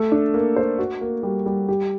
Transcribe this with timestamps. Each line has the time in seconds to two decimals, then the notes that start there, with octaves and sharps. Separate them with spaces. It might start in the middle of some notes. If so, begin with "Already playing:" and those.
Already playing: A3 A4
0.12 D4
0.34 A#3
0.56 C5
0.79 F#4
1.01 A#3
1.23 G3
1.46 G3
1.69 G4